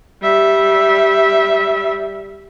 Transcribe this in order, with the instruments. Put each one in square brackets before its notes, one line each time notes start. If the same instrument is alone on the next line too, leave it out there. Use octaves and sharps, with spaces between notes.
[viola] G3 E5